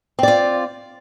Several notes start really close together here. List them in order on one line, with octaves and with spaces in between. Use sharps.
C4 D5 F4